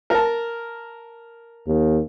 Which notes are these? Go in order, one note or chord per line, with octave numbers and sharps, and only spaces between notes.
A#4 A5
D#2